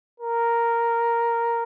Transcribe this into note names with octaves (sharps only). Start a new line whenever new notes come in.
A#4